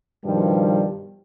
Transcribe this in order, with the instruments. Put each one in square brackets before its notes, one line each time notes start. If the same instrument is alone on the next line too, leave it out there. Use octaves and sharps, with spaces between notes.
[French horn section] G2 B2 D#3 F3 G3